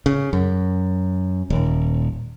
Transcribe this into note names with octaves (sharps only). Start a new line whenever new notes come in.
C#3
F#2
D#1